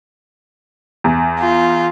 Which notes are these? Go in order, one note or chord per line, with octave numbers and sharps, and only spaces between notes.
E2
F4